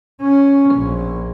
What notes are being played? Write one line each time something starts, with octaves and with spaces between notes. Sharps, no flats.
C#4
A#1